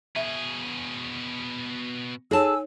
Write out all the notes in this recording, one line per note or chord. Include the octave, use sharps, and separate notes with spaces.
B2 G#4 E5
D#4 G#4 A4 C#5 G#5 A5 E6